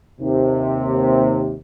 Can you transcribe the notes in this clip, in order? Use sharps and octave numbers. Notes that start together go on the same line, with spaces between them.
D#2 C3